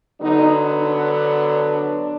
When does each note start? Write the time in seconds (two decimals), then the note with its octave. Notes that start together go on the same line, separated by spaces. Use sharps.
0.20 D3 F#3 B3 D#4
0.80 D4